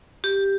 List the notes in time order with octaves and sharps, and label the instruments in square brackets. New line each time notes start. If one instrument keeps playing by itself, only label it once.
[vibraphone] G4